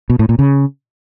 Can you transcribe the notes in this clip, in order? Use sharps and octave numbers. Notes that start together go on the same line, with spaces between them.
B2
A2
A#2
C#3